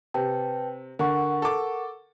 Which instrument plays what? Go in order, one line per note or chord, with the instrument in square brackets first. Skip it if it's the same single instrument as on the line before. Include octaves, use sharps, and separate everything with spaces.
[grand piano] C3 [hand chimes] B4 G5 A5
[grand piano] D3 [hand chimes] A#4 F#5 C#6
[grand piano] A4 D6